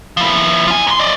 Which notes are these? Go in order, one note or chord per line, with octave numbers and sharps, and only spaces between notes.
F3 E4
F4 G#5
G#2 C6
D5 D#5